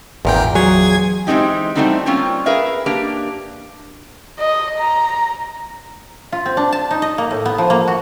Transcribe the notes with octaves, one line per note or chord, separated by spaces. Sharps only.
G#1 E2 A#2 A#4 G5
F#3 G#4 G#6
E3 G#3 A3 C4 D#4 G4
G3 A3 C4 D#4 E4 F#4
G3 A#3 C4 C#4 F4
G#4 A#4 B4 E5 F5
A#3 D4 G4 A#4
D#5
A#5
F4
C4
D4
A5
D#4
D#5
A#3
A2
B3
F3
A#3
F#4